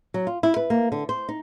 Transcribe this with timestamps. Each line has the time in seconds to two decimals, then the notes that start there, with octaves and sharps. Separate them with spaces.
0.14 F#3
0.27 F4
0.43 E4
0.56 B4
0.70 A#3
0.92 D3
1.09 C5
1.29 D#4